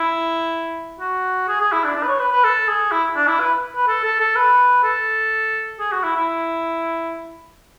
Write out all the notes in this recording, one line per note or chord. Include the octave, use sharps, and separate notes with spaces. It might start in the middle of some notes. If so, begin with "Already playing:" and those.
Already playing: E4
F#4
G#4
G#4
E4
D4
D4
B4
C#5
B4
B4
A4
G#4
E4
D4
E4
B4
B4
A4
A4
A4
B4
A4
G#4
F#4
E4
E4